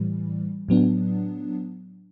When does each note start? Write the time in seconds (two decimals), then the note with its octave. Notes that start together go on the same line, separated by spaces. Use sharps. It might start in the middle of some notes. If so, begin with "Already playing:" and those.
Already playing: A2 E3 G3
0.68 A2 F#3 B3 D4